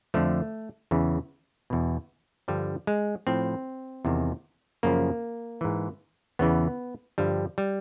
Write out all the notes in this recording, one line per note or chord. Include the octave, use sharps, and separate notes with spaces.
F2 D3 F3 A3
E2 C#3 E3
E2 B2
G2 D3 F3 G3
G#3
A2 F3 C4
E2 C3 D#3
F#2 C#3 F3 A#3
G#2 E3
E2 C#3 E3 B3
G2 D3 F3 G3
G3